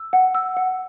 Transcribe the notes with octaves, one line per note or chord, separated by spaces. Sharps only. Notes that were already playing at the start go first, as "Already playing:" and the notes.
Already playing: E6
F#5
E6
F#5